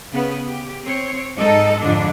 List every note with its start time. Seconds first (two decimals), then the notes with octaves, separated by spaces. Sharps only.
0.11 C#3 B3
0.45 G4
0.83 C4 C#5
1.36 G#2 G#3 D#4 A4 D#5
1.81 F2 G#2 D3 D4